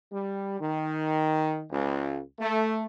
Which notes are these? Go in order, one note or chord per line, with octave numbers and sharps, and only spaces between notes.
G3
D#3
C#2
A3